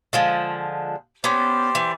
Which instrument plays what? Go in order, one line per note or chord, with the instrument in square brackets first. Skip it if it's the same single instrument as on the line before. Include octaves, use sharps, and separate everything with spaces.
[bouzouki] D3 F3 G#3
[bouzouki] B3 C#4 [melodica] G4 C5 D5
[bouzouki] E3